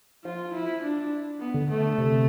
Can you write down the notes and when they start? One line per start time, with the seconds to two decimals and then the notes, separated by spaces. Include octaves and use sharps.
0.24 F3 F4
0.53 E4
0.83 D4
1.40 B3
1.54 D3
1.70 A3
1.98 C3